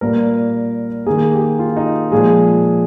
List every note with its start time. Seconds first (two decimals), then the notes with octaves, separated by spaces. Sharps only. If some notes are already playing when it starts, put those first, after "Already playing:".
0.01 A#2 G3 A#3 A#4
1.06 D#3 A#3 G#4
1.33 G4
1.59 F4
1.76 D#4
2.11 A#2 F3 G#3 G#4